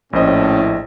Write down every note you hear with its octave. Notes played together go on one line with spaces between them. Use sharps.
A#1 A2 C#4 C5 D#5